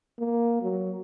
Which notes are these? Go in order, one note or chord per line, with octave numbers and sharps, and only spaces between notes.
A#3
F#3